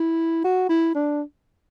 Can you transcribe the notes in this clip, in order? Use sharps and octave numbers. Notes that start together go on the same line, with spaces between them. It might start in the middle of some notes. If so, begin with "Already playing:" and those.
Already playing: E4
F#4
E4
D4